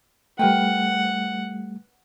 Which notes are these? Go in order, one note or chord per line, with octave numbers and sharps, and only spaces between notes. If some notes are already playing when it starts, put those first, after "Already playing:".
G3 A3 A#4 B4 F#5 G5